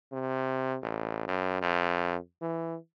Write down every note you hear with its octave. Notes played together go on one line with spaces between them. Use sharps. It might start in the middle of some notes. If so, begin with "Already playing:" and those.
C3
A1
F#2
F2
E3